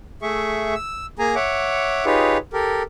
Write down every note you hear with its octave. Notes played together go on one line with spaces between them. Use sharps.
A3 G#4 E5 C#6
E6
A#3 G#4 G#5 A#5
C#5 E5 F#5 D6
D#4 F4 G4 G#4 B4 C#5
G4 A4 A#4